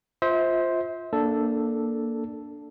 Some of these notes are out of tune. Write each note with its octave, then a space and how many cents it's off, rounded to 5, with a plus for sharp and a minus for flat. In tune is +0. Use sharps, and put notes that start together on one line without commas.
F4 +0 C5 +0 E5 -40
A#3 +0 D4 +0 A4 +0